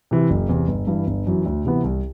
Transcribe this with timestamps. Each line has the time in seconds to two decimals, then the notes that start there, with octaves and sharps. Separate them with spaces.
0.11 C3 E3
0.30 F#1
0.49 E2 C3
0.68 G1
0.87 G2 E3
1.07 G1
1.27 F#2 E3
1.45 D2
1.65 C3 E3 B3
1.83 C2